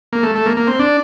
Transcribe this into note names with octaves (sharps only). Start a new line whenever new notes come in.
A#3
A3
A3
A#3
A#3
C4
D4